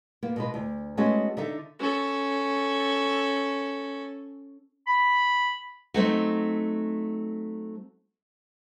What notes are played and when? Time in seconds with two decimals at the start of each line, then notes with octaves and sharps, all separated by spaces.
0.23 A#3 B3
0.36 B2 G#3 B4
0.54 D2
0.97 G#3 A3 B3 C#4 F#4 G#4
1.37 D3 D#4 A4 E5
1.79 C#4 A4
4.87 B5
5.94 F#3 A3 C4 D#4